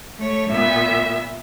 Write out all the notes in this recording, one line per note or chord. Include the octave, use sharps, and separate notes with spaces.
A3 C#5
A#2 B3 E5